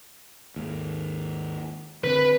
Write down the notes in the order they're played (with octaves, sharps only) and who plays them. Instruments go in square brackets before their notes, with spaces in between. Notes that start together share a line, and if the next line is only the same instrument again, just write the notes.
[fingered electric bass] D#2 G#2
[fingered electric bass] D3 C4 [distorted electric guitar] B4